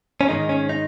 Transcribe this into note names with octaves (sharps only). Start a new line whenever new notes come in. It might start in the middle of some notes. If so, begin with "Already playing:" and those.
C#4
G#2 D#3 G#3 D#4
C#4
D#4